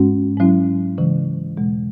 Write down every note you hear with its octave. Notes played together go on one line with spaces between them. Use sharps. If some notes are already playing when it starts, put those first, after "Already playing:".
Already playing: G#2 G#3 C#4 F#4
G#2 F#3 C#4 E4
C#3 E3 G#3
E2 B2 G#3